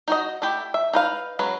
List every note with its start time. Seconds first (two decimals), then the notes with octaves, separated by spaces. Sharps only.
0.08 D#4 F#4 D#5
0.42 A3 E4 G4
0.74 E5
0.93 D#4 B4 F5
1.39 F#3 G#3 C#4 B4